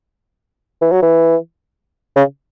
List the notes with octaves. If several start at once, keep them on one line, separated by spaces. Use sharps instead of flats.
E3
F#3
E3
C#3